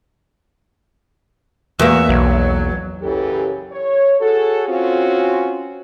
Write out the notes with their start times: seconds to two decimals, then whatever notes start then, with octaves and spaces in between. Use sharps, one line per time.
1.79 E2 A#3 F#4 E5
2.09 B1 F#3
3.02 F#2 C#3 E3 G4 A4
3.72 C#5
4.20 F#4 G#4 A4
4.67 C4 C#4 F4 F#4